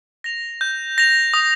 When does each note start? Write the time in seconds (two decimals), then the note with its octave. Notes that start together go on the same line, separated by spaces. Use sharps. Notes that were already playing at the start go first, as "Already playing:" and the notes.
0.24 A#6 F7
0.61 G6
0.98 A#6 F7
1.34 D#6